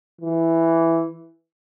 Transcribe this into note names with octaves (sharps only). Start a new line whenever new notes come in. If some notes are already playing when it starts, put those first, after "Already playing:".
E3